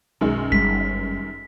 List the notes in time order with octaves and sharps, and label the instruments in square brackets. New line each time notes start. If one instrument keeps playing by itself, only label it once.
[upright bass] B1 F4 [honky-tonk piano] F#2 D#3 G#3
[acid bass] G1 [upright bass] G3 C#4 [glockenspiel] B6